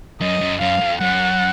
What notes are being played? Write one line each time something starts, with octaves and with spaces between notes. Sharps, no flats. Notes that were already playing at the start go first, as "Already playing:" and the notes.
F#2 D#5
F#2
F#2 F5
F2
F#2 F#5